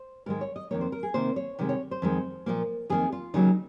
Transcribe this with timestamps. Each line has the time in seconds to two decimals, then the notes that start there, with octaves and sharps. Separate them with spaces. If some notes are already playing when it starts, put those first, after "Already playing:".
Already playing: C5
0.26 G#2 D#3 G#3 A#4
0.41 C#5
0.56 D#5
0.71 F2 D#3 A#3 C#5
0.81 C5
0.92 A#4
1.03 G#4
1.14 C3 D#3 A#3 C5
1.36 C#5
1.59 C3 D#3 G#3
1.69 C#5
1.91 C5
2.02 F2 D#3 G#3
2.46 A#2 F3 A#3
2.90 F2 D#3 A#3 G#4
3.12 F4
3.34 D#2 C#3 F#3 A#3 D#4